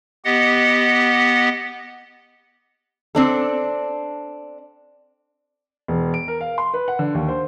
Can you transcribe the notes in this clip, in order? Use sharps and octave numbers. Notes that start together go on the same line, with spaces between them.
B3 G4 D#5 F#5
C4 D4 A4
E1
D7
A#4
F5
C6
B4
F#5
D3
D#2
C5